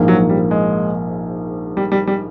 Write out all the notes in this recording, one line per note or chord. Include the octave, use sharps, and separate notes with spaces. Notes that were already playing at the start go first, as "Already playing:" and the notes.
Already playing: A#1 G#2 F3 A#3
F#3
G3
G#3
G3
G3
G3